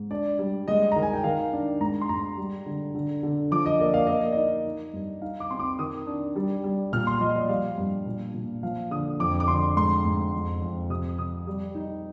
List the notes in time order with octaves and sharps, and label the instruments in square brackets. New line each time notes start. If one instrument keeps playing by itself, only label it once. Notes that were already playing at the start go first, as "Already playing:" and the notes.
Already playing: [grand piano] G#2
D4 D5
G3
G#3 D#5
D#3 A#5
G#5
G5
D#3 F5
D4
G#2 A#5
C6
G#2 A#5
G3
D3
D3
D3
F3 D6
D#5
A#3 D5
F5
A#3 D#5
D5
D#4 D#5
D#4
G2
D#4 F5
D6
C4 C6
D6
D#3 D#6
D4
G3
G3
A#2 F6
C6
F3 D#5
D5
G3 F5
G2
A#2
A#2
F3 F5
D3 D#6
F2 D6
D6
D3 C6
G#2 C6
G#2
F2
F2
C3 D#6
C3 D#6
G3
D#4